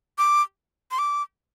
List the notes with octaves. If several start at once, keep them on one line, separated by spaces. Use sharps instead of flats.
D6
C6
D6